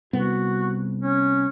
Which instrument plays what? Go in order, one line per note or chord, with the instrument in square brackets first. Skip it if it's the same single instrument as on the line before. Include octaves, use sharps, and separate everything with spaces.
[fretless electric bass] C2 B3 [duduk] F#4
[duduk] C#4